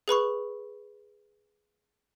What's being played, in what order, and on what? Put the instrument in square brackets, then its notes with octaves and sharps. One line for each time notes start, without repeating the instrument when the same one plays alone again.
[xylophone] G#4 B4 B5 C#6